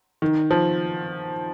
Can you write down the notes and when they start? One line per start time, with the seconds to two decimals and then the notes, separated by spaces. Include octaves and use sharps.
0.22 D#3
0.51 F3